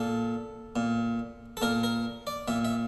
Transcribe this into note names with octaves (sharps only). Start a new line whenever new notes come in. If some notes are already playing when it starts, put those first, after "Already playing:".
Already playing: A#2 A4
A#2
A4
A#2 A#4
A#4
D5
A#2 E5
E5